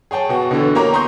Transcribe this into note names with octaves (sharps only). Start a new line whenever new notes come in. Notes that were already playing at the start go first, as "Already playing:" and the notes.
G#4 C#5 G5 A5
B2 F#4
B2 D3 E3
A#3 G4 C#5 A#5
A#5 C6 C#6 D#6 G6